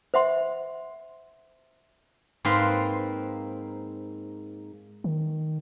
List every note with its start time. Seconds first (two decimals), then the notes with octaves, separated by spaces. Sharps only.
0.14 C5 E5 F#5 C6
2.45 G#2 A#3 C4 A#4 B4 C6
5.04 D#3